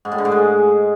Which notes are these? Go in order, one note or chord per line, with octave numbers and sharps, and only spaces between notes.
G#2
A2
D3
G#2
G#3